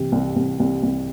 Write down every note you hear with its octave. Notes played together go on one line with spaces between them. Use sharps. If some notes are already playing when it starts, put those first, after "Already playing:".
Already playing: C2 C3 E3
C2
C2
C2
C2